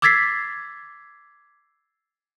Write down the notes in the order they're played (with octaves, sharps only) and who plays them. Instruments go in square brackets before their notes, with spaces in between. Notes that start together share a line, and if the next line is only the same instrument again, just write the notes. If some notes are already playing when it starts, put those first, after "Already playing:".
[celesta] D6 E6 G#6 A6 B6 C7